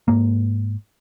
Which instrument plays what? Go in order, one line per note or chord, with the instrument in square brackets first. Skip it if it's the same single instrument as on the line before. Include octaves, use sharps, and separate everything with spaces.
[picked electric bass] G#2 A#3